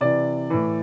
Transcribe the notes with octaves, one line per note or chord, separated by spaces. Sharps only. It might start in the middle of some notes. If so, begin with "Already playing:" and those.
C3 E3 D5
A2 E3